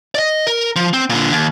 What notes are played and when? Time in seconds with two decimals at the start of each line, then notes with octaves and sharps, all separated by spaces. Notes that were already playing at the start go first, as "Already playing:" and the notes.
0.15 D5 D#5
0.47 A#4
0.76 F3
0.93 C4
1.10 A#2 D3
1.32 D#2